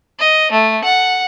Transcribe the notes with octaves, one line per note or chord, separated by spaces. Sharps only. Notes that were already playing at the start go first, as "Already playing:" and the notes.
D#5
A3
F#5